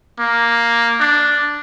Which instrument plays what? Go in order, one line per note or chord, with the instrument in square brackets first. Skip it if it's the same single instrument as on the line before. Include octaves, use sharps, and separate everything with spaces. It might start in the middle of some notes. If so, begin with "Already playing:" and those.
[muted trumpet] A#3
D4